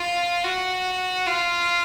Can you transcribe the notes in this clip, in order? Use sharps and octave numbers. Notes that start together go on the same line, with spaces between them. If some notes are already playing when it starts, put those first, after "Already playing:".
Already playing: F4
F#4
F4